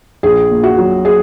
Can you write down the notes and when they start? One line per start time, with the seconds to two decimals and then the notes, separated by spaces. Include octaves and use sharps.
0.23 A#1 G#4
0.51 A#2
0.64 F#4
0.78 F#3
1.05 G#4